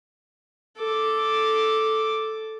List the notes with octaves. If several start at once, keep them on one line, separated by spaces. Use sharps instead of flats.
A4 D6